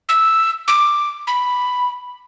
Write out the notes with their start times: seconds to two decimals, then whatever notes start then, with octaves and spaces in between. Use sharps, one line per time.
0.09 E6
0.68 D6
1.27 B5